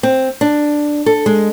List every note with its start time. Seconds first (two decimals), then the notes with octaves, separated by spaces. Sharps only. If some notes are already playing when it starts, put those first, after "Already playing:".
0.03 C4
0.41 D4
1.06 A4
1.26 G#3